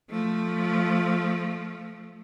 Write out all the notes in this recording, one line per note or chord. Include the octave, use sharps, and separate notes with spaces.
F3 A3